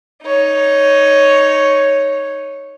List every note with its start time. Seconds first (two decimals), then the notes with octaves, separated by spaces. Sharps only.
0.23 D#4 C#5